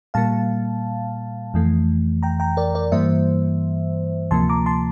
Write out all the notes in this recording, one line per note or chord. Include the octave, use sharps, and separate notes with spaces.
A#2 G3 A#3 F5 A5
F2 E3 A3
G5 A#5
G5 A#5
A#4 D5
A#4 D5
G2 E3 G3 A#3 C5 E5
D2 C3 F3 A#3 A5 C6
A#5 D6
A5 C6